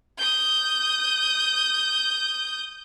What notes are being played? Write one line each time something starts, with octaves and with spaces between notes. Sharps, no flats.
D#6 G6